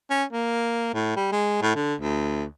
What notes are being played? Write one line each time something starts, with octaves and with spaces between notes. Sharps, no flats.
C#4
A#3
A2
G3
G#3
A2
D3
D2